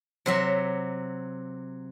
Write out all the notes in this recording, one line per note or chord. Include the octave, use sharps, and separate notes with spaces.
C3 F#3 E5